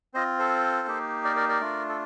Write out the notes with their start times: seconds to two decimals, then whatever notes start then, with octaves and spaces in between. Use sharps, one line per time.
0.14 C4 F4 C5 D#5
0.39 A4 C5
0.88 A#3 D#4 G4
1.25 A#4 D5
1.36 A#4 D5
1.49 A#4 D5
1.60 A3 D4 F4
1.89 A4